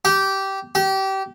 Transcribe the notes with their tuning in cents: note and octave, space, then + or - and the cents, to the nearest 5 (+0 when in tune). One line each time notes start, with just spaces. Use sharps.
G4 -15
G4 -25